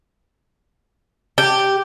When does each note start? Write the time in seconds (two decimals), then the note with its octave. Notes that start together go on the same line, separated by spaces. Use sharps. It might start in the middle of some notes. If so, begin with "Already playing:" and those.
1.38 G4